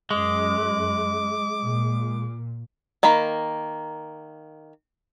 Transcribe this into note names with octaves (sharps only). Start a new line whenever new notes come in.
F#2 G#3 D6
A#2
D#3 A#3 A#5 B5